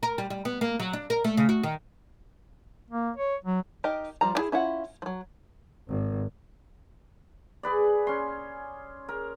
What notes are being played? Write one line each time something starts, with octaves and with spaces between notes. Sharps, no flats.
A#4
G3
G3
B3
A#3
F#3
D4
A#4
A3
C#3
F#4
D#3
A#3
C#5
F#3
D#4 G4 A#4 D#5
F3 G3 A#5
G3 E4 G#4
C#4 E4 F4 F#5
F3 F#3
G#1
G#4 B4 D5
C#4 C6
A#4